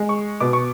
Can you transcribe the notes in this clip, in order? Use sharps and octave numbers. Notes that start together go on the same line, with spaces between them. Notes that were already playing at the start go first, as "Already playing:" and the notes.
Already playing: G#3
C#6
B2 D6
C#6